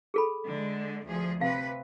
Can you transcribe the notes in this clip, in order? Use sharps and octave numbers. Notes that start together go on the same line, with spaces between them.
G#4 A4 B5
D3 G#3
D2 F3 G#4
C3 B4 F5